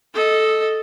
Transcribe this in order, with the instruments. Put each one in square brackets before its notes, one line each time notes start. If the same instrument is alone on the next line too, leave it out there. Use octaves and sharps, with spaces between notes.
[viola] A4 D#5